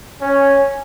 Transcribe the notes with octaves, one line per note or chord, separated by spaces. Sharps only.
C#4